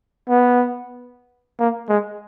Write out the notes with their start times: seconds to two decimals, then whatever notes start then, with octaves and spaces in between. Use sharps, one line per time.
0.29 B3
1.59 A#3
1.89 G#3